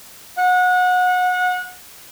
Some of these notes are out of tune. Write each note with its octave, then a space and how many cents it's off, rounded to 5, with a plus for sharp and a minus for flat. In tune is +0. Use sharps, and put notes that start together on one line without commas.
F#5 -25